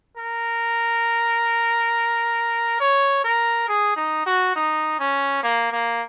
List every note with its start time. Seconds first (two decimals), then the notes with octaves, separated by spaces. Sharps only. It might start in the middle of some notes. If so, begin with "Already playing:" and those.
0.17 A#4
2.80 C#5
3.24 A#4
3.68 G#4
3.96 D#4
4.26 F#4
4.56 D#4
5.00 C#4
5.43 A#3
5.72 A#3